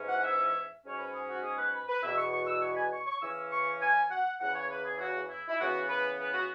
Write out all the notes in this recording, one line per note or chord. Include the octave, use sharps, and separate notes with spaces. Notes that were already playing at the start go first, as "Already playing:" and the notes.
Already playing: G#2 E3 C#4
F#5
E5
G#2 F#3 C#4 C#5
B4
G#4
F#4
G#4
B4
B4
B4
E2 B2 B3 E5
C#6
C#6
E6
C#6
B5
G#5
C#6
C#6
C#3 E3 C#4 E6
C#6
G#5
F#5
E2 C#3 E3 F#5
C#5
B4
G#4
E4
F#4
E4
E4
C#3 E3 B3 F#4
B4
B4
F#4